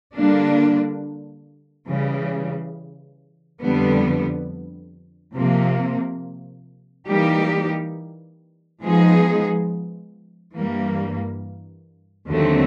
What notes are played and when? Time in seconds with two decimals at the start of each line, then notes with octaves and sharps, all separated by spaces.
0.14 D3 G3 A#3 D4
1.88 C#3 E3 G3
3.62 F2 D3 G3 B3
5.35 C3 F3 A#3
7.09 E3 G3 A#3 D#4 G4
8.82 F3 G#3 B3 D#4 G#4
10.56 G2 E3 G3 A#3
12.30 D#2 D3 F#3 A3 C4